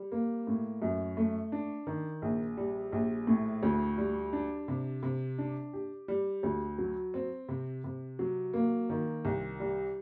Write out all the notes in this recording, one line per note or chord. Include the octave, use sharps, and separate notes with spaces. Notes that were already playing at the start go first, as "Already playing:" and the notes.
Already playing: G3
A#3
A2
F#2
A3
D4
D#3
A#1
G3
A#1
A2
D2
G3
D4
C3
C3
D4
G4
G3
D2
F#3
C4
C3
C3
F#3
A#3
D#3
C2
G3